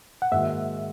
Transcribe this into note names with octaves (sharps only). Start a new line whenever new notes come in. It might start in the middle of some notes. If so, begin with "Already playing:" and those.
F#5
G#2 D#3 A#3 D#4 F#4 E5